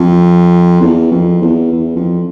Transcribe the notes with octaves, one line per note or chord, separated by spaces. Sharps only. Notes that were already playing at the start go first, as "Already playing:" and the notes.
Already playing: F2
E2
F2
E2
E2
F2